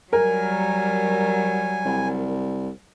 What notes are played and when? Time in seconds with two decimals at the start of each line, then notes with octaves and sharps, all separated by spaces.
0.13 F#3 G3 A#4 G#5
1.85 C2